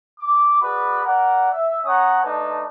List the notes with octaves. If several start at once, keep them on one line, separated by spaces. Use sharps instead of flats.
D6
F#4 G#4 B4 D5 B5
A#4 D5 F#5
E5
C#4 C#5 F#5 A#5 D#6
A3 D4 D#4 B4 A5